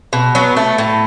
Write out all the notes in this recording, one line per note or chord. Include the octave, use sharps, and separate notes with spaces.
B2
F#3 B3
A3
A2